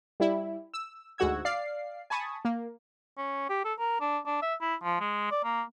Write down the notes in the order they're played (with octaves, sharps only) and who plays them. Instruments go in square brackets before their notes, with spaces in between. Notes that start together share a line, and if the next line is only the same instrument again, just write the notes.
[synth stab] G3 E4
E6
D2 G#2 F#4 F#5 E6 G#6
D5 F5 C7
G#5 A5 B5 C#6 D#6
A#3
[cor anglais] C#4
G4
A4
A#4
D4
D4
E5
E4
F3
G#3
D5
A#3